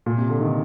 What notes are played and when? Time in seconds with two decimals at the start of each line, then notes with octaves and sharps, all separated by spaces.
0.06 A#2
0.18 C3
0.29 D3
0.41 D#3